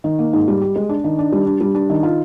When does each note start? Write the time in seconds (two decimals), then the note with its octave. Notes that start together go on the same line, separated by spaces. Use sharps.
0.04 D#3
0.19 A#3
0.33 G#2
0.48 G3
0.62 G4
0.76 G#3
0.89 D4
1.04 D#3
1.19 D4
1.32 G3
1.46 D4
1.61 G3
1.75 D4
1.90 D#3
2.03 F4